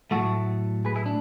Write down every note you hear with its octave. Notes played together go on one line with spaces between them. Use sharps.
A2 F#3 A3 F#4 A4
G#4 B4
E4 G#4
D4